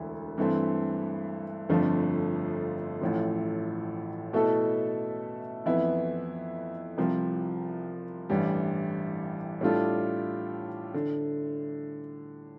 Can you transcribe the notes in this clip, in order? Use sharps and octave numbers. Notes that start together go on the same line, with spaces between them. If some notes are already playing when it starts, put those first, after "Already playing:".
Already playing: E1 D2 E3
G2 E3 A3 C4
G1 F2 D3 F3 A3
A1 A2 F3
B2 A3 E4 A4
F2 E3 B3 E4
C2 C3 F3
A1 G2 E3 G3
A2 G3 D4 F4 A4
D3